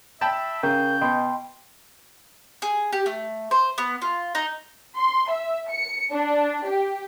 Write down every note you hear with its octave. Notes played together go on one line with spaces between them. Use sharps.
E5 G5 A5 B5
C#3 A#4 G5 G6
B2 D#5 G5 B5 C6
G#4
G4
A3
C5
B3
F4
D#4
C6
E5
C#7
D4
G4